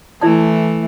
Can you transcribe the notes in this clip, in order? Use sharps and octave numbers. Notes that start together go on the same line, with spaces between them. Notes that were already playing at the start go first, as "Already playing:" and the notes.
E3 A3 E4 D5 A5